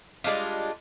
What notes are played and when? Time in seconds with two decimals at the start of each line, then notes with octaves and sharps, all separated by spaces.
0.24 G3 G#3 D4 F4